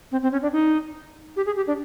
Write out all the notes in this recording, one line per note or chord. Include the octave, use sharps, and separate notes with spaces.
C4
C4
C#4
D4
D#4
G4
G#4
G4
D4